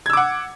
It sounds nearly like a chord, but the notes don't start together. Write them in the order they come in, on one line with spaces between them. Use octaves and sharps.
G#6 E6 D6 F#5